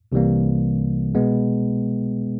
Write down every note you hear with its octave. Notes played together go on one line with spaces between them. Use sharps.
C2 C3 E3 G3 A#3
B2 G#3 B3